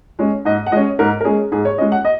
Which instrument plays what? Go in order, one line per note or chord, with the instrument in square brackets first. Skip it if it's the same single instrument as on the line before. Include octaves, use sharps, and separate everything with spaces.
[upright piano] G#3 C#4
G#2 D#5
F#5
G#3 C#4 D#5
G#2 A#4
A#4
G#3 C#4 G#4
G#2 G#4
C#5
G#3 C#4 D#5
F#5
D#5